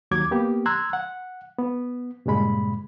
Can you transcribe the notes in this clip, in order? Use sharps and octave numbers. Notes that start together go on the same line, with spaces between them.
D#2 F#3 D6 G#6
A#3 B3 G4
A#5 C6 E6 F#6 G#6
F#5
B3
G2 A#2 C#3 G#3 B5